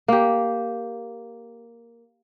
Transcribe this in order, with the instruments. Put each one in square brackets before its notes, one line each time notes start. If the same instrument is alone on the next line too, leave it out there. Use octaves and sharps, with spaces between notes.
[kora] A#3 G4